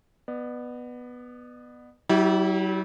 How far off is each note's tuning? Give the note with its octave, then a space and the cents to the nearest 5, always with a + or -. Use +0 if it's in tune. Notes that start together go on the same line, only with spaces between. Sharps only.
B3 +0 D5 +45
F#3 +40 E4 -30 G4 +0